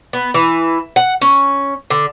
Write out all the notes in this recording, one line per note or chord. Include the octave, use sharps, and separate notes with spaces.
B3
E3
F#5
C#4
D3